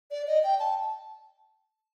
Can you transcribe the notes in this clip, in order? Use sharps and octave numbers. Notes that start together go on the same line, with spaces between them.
D5
D#5
G5
A5